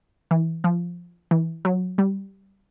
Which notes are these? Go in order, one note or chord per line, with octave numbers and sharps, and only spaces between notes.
E3
F3
E3
F#3
G3